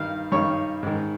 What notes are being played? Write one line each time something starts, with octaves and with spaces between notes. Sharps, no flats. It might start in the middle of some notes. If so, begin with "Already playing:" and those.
Already playing: G2 D#3 F5
G2 D#3 C#5
G#2 D#3